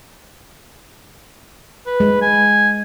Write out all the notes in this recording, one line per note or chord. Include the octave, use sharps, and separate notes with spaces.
B4
G#3
G#5